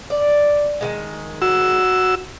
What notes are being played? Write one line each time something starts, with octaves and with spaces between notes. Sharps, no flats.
D5
D#3 E3 G#3
F#4 E6